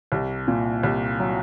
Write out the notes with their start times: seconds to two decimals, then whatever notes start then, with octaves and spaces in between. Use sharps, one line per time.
0.12 C2
0.48 A#2
0.83 C2
1.19 F#3